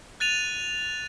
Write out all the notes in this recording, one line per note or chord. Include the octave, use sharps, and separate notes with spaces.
F#6 A6 D#7 F7